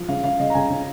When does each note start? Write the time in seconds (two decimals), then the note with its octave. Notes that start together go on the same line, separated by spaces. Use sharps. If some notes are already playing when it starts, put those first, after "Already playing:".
Already playing: F3
0.08 C#3 F5
0.23 C#3 F5
0.40 C#3 D#5
0.50 A#5
0.55 C#3 G#5
0.70 C#3